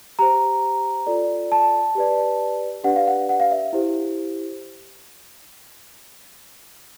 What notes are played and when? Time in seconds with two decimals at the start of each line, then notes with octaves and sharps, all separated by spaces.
0.19 G4 C5 A#5
1.07 F4 A4 D5
1.52 A5
1.95 G4 B4 D5
2.84 D4 G4 B4 D5 F#5
2.96 F5
3.07 F#5
3.29 F#5
3.40 F5
3.51 E5
3.73 E4 G4 C5